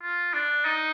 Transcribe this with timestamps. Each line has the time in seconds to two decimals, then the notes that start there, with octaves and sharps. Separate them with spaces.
0.03 F4
0.34 D4
0.65 D#4